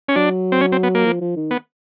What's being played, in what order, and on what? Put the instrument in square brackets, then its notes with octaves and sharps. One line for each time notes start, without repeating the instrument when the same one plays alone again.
[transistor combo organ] C#4
[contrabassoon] F#3 [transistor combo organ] D4
[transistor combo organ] C4
C#4
C4
B3
A#3
[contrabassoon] F3
F3
D#3
[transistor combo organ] B3